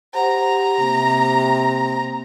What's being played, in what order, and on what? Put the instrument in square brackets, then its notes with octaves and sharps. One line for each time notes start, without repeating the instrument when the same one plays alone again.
[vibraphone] G4 F#5 [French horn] C5 [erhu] A#5
[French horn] C3 [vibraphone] A#3